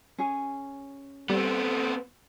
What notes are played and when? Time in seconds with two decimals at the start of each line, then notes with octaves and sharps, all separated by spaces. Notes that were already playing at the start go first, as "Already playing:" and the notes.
0.18 C#4 G#4
1.30 G3 B3 C4 A4